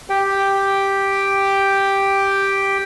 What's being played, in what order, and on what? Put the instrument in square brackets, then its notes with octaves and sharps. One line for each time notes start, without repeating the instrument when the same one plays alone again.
[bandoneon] G4 G5